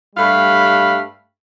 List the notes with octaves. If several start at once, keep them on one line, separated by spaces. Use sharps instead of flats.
G2 G3 A3 F5 B5